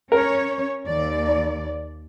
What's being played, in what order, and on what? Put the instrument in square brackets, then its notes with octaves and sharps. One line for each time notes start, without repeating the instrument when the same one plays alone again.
[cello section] C#4 C#5 [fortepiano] A#4
[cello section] D#2 D5